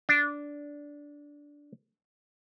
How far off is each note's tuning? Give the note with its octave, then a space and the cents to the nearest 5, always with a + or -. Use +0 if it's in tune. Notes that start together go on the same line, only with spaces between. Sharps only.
D4 -10